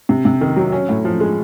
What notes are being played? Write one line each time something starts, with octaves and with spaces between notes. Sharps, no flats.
C3
C3
D#3
F#3
C#4
A2
F3
G#3